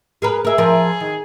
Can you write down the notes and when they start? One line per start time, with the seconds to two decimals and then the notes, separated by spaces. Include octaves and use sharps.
0.22 G#4 A#4 B4
0.45 G#4 A#4 E5
0.58 F3 A#4
1.00 D#3